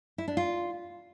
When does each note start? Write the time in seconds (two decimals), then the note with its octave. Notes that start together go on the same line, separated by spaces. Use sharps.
0.18 E4
0.28 D4
0.37 F4